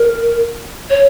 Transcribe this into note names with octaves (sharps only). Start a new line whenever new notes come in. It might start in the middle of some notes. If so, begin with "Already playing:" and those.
Already playing: A#4
C#5